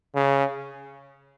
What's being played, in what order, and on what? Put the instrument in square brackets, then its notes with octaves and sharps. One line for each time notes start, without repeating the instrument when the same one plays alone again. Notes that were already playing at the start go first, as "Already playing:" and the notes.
[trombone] C#3